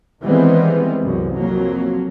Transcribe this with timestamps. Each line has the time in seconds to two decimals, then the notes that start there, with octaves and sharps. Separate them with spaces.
0.22 D#3 E3 G3 G#3 B3 C4
1.02 C2 F#2
1.35 F2 F#3 A#3